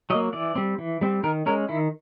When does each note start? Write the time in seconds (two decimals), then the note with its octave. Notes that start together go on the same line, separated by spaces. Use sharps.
0.10 F#3 D#5
0.15 A#3
0.33 E3 D5
0.56 G3 C4
0.78 E3
1.01 G3 C4
1.24 D#3 A#4
1.46 G#3 C#4 A#4
1.69 D#3 E4